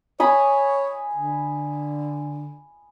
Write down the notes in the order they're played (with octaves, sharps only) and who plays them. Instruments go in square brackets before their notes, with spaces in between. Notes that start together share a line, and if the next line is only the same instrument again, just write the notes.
[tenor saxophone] C#5 [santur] G#5 B5 D#6
[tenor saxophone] D3